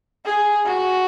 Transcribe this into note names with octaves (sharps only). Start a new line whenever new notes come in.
G#4
F#4